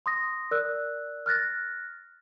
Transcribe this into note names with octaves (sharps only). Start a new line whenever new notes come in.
C6 D#6 A#6
A#4 D5 E6 F#6
F6 F#6 A6 A#6